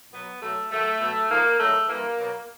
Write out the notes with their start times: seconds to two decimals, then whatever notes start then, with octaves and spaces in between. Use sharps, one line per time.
0.12 B2 F#3 B3
0.41 B2 F#3 A3
0.70 G#2 D#3 F#3 A3
1.00 B2 F#3
1.29 G#2 F3 A#3
1.59 G#2 D#3 F#3 A3
1.88 G2 E3 A#3
2.18 B2 F#3